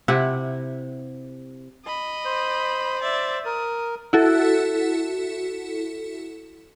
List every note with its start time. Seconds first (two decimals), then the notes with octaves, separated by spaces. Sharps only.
0.08 C3 E4 F#5
1.86 D#5 B5
2.25 C5
3.02 D5 E5
3.45 A#4 D#6
4.13 E4 F#4 A4